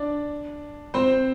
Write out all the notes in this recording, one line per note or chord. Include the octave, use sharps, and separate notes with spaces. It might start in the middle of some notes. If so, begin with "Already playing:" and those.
Already playing: D4 D5
C4 C5